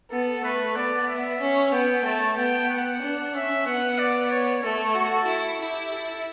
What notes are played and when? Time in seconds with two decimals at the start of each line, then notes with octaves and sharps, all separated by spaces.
0.11 B3 A4
0.43 A3 B4
0.76 B3 D5
1.08 E5
1.40 C#4
1.72 B3 G5
2.05 A3 A5
2.37 B3 G5
2.70 F#5
3.02 D4
3.34 C#4 E5
3.66 B3 F#5
3.99 D5
4.31 C#5
4.63 A3 A4
4.95 F#4
5.28 E4
5.60 E4 G4
5.92 A4